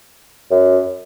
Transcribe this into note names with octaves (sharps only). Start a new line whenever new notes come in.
F#2